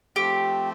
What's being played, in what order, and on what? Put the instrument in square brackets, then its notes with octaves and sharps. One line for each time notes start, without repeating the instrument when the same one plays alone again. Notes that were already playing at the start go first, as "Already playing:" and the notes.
[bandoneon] F3 A3 C4 [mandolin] G4